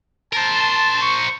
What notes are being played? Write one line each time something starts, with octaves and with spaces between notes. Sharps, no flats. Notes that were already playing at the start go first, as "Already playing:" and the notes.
A#4 C5 A5
C#6